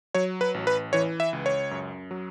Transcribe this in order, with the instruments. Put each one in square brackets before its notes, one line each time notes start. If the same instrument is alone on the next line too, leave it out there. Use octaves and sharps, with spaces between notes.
[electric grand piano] F#3 C#5
B4
A1
B4
E3 C#5
E5
C#2
C#5
F#2
F#3